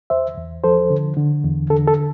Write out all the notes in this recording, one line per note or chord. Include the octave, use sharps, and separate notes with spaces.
E2 C5 E5
E2
F3 A4 C5
D3
D3
E2
D3 A4
A4